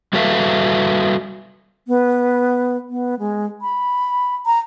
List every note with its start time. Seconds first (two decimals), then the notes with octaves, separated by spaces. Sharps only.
0.13 G3 F#4 A4 B4 E5 F5
1.88 B3
2.90 B3
3.19 G#3
3.62 B5
4.46 A#5